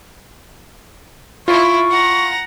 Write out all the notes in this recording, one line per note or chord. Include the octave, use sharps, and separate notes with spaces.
E4 F4 C#6
F#5 A#5